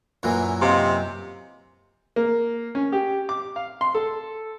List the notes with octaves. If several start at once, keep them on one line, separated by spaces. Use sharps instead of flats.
F#2 A#2 E3
C3 D#5 F5 C6
A#3
C#4
G4
D6
F5
C6
A4